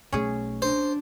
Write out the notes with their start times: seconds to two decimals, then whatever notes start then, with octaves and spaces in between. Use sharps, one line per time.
0.13 B1 A3 C#4 G#4
0.62 D4 C5